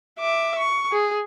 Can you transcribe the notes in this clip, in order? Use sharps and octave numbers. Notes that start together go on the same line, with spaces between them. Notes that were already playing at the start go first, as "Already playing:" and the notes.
E5 D6
C#6
G#4